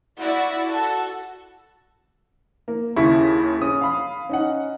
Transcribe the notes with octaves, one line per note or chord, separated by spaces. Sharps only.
E4 F#4 D5
F#4 A4
A#3
D#2 C#3 E4 C#6 B6
C#4 D#6
F5 B5
C#4 D#4 F#5